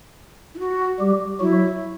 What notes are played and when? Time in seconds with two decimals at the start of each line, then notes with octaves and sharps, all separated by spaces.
0.55 E4
0.59 F#4
0.99 G3 G4
1.40 F#3 E4 F#4